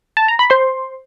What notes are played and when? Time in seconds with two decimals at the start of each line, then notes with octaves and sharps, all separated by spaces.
0.17 A5
0.28 A#5
0.39 B5
0.50 C5 C6